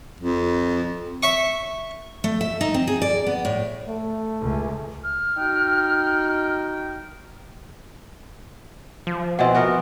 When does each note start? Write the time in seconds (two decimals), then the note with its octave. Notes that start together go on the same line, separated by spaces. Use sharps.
0.21 F2
1.23 E5 C#6
2.24 A3
2.41 E5
2.61 D#4
2.74 C4
2.87 G#4
3.02 D5
3.26 B3
3.45 A2
3.87 A3
4.41 C#2
5.04 F6
5.37 D#4 F#4 G5
9.07 F3
9.39 B2 E3 C4 D#5 F#5
9.55 B3 F#4 A#4